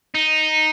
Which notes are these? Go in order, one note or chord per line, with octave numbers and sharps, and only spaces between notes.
D#4